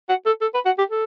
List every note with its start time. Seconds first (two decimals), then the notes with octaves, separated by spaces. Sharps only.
0.09 F#4
0.26 A4
0.41 A4
0.54 B4
0.65 F#4
0.78 G4
0.90 A4